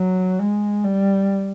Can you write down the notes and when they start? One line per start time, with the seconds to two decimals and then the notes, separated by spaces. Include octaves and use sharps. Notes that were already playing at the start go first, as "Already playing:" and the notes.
Already playing: F#3
0.39 G#3
0.84 G3